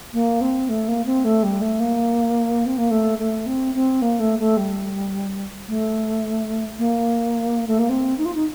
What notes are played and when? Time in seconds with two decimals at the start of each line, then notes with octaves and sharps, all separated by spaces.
0.13 A#3
0.40 C4
0.68 A3
0.87 A#3
1.05 C4
1.24 A3
1.43 G3
1.61 A3
1.79 A#3
2.65 C4
2.77 A#3
2.90 A3
3.18 A3
3.46 C4
3.74 C4
4.01 A#3
4.19 A3
4.39 A3
4.56 G3
5.67 A3
6.78 A#3
7.67 A3
7.78 A#3
7.89 C4
8.17 D#4
8.25 F4
8.34 D#4